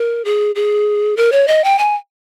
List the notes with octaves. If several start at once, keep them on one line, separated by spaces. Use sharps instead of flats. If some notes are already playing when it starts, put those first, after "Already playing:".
Already playing: A#4
G#4
G#4
A#4
C#5
D#5
G5
G#5